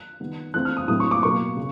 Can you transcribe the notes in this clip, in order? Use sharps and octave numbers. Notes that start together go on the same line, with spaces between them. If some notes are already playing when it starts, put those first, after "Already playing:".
Already playing: F#6
D#3 G3 B3
E3 A3 C4 F#6
F6
D#6
A2 F#3 A3 C4 D#6
C#6
D6
B2 F#3 A#3 C#6
C#3